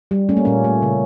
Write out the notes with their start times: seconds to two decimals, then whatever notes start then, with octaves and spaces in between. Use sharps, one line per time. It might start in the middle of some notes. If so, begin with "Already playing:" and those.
0.11 G3
0.29 A3 C#4
0.37 A#3
0.45 A#2 C#4
0.64 A3
0.82 C#3